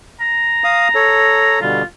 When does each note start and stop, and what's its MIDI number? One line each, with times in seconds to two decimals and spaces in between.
0.20 1.58 82
0.64 0.88 77
0.64 0.88 87
0.95 1.59 69
0.95 1.59 73
1.62 1.83 47
1.62 1.83 50
1.62 1.83 55
1.62 1.83 65